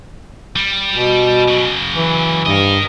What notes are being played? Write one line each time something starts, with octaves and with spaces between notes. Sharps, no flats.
G3
B2
C#3 F#3
E3
G2 A#4 D#5